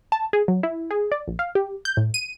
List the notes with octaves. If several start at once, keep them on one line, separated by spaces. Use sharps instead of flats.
A5
G#4
F#3
E4
G#4
D5
A#1
F5
G4
G6
A2
D#7